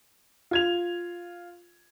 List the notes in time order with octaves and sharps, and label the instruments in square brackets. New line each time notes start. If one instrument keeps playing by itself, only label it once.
[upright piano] F4 G#6 F7